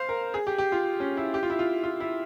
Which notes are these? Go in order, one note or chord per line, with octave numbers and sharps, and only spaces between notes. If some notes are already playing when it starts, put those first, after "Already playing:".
Already playing: C5 F5
A#4
G#4
G4
G4
F4
C#4
E4
G4
F4
E4
F4
F4
E4